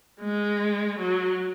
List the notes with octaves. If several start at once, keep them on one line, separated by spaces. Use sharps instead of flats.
G#3
F#3